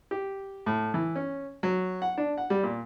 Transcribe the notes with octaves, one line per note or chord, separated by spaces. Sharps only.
G4
A2
E3
C#4
F#3
F#5
D4
F#5
G3
A#2